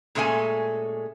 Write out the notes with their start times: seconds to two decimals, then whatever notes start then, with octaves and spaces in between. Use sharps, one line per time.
0.15 A#2 G#3 A3 C#4 A4 G#5